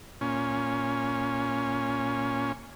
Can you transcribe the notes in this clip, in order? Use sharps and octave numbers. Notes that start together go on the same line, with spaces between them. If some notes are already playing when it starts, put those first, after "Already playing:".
A#2 C#4